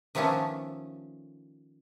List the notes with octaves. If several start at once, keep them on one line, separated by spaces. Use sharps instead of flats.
D#3 F3 A3 B3 C#4 D4